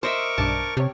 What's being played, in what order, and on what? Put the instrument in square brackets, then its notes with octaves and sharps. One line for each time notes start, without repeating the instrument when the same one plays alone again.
[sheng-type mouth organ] A#4 C#6 D6 [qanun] C5 D#5 E5
[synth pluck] B1 G2 D4 [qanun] A5
[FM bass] C3 [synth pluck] G4 C#5